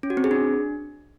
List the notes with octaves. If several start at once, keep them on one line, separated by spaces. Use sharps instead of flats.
C#4
F#4
C4
G#4
D4